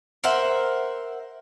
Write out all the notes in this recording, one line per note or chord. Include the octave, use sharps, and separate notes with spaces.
A#4 C5 E5 F#5